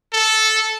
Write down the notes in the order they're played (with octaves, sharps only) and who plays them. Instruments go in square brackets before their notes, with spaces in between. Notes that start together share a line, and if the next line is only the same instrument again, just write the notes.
[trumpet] A4